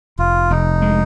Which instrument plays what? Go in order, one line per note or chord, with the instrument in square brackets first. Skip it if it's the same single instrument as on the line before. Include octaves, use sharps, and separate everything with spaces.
[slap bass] F1 [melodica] F4
[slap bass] F1 [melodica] D#4
[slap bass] G#3